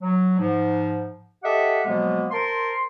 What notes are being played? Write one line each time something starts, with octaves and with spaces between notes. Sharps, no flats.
F#3
G#2 F3
G4 A4 D#5 E5 F#5
B2 F3 F#3 G#3 A#3 B3
A#4 C5 A5 C6